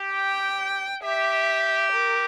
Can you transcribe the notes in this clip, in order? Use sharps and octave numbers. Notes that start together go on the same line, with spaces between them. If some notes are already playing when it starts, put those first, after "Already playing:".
Already playing: G4
G5
G4 E5
A#4